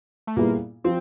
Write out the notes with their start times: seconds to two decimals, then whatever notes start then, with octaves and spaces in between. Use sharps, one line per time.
0.27 A3
0.36 A#2 G3 A#3 B3 E4 G#4
0.84 F3 C4